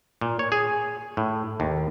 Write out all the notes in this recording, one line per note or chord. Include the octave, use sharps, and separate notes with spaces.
A#2
C#5
G#4
A2
D#2